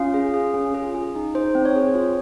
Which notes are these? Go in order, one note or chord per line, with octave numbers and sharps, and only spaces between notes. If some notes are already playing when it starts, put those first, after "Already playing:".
Already playing: C#4 F4 F5
G#4
G#4
C#4
G#4
G#4
D#4
D#4 C5
C4
C#5
G#4
F4